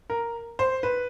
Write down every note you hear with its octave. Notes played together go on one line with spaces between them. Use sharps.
A#4
C5
B4